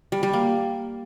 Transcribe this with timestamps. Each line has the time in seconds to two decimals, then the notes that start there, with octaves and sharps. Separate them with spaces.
0.12 G3
0.23 G3
0.33 A#3